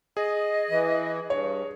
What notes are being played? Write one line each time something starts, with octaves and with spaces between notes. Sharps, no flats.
G#4 D#5
E3
G2 C#5